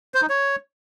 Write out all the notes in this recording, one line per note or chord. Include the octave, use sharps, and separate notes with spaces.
C5
D#4
C#5